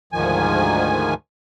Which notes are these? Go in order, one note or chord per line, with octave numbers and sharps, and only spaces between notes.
D2 G#2 D#3 F3 G#5